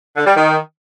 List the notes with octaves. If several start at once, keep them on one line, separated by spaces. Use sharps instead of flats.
D3
G3
D#3